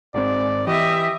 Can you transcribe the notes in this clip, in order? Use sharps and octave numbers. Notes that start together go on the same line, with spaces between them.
G#1 G#2 C4 D5
E3 G4 D#5 E5